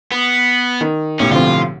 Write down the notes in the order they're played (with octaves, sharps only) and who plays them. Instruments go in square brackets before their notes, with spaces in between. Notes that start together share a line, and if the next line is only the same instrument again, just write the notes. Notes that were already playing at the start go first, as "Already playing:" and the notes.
[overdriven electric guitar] B3
[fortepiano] D#3
[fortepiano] B1 A2 G4 [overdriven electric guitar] C#4
[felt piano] D3 F3 C4 [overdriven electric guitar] F4